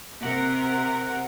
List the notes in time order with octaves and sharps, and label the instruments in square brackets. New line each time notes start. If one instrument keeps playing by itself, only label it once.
[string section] C3 A#4 [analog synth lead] F#5